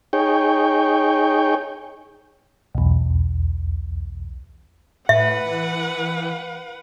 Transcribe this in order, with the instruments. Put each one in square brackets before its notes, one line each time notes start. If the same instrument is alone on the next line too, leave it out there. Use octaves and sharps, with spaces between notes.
[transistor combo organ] D#4 G#4 C#5 G5
[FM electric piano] B1 E2
[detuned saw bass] A2 [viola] B4 F#5 [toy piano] E5
[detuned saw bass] E3